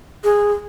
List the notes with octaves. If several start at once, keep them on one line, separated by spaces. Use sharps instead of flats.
G#4